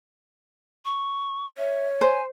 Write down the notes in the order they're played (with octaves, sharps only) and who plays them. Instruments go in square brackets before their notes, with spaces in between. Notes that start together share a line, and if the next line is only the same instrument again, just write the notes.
[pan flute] C#6
[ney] C#5 [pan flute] E5
[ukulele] C5 [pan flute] G#5